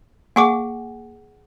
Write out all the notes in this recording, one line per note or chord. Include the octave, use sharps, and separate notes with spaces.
A#3 G#4 F#5 G#5 C#6 D6